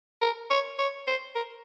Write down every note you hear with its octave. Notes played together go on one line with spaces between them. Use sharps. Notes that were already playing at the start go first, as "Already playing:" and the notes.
A#4
C#5
C#5
C5
A#4